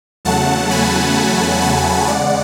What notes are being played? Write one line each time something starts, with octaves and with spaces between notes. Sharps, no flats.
E2 C#3 F#3 A3 F#5 A5
G#5 B5
F#5 A5
E2 C#3 G#3 D5 F#5